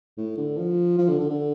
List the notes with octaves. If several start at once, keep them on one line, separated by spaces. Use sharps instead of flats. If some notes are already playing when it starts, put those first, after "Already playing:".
A2
D3
F3
F3
D3
D3
D3